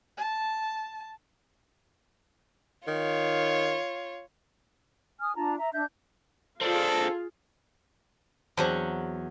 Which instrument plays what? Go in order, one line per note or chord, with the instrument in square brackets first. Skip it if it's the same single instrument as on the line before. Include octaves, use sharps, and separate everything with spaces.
[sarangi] A5
[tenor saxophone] D#3 [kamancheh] F4 C#5
[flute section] G#5 D#6 F6
D4 F4 A5 A#5
E5 A#5
D4 E5 G6
[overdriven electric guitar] C4 D4 [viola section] F4 G#4 [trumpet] A4
[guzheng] E2 F#3 F#5 [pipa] C4 D4 C5